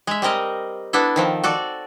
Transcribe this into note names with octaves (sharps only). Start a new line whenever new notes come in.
G#3 E5
G3 C4 A#4 D#5
B3 D4 E4 A4
D#3 F3 C4
F#4 A4 D5